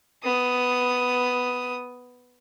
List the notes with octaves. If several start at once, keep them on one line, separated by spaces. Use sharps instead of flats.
B3 D#6